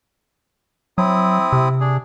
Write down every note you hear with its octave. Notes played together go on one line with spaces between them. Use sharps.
F#3 C4 E4 D#6
C3
D4 G#4